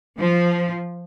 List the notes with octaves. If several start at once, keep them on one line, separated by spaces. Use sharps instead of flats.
F3